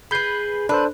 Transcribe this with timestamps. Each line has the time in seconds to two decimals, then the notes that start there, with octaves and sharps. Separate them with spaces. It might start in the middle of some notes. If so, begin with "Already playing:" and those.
0.11 G#4 B4 B5 G6 C7
0.69 D4 A4 B4 C5